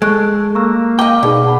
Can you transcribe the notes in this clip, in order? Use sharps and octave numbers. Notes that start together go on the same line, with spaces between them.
G#3 A4 C#6 F#6 D7
A#3 A#5 C#6 E6
D#5 F5 G5 D6
B2 D#4 G#4 D5
F#5 A5 B5